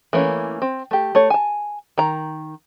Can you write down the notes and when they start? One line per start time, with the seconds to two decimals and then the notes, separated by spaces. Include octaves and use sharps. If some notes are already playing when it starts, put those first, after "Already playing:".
0.13 E3 A3 A#3 C#4
0.62 C4
0.91 A3 G4
1.15 A3 C#5
1.30 G#5 A5
1.98 D#3 A#5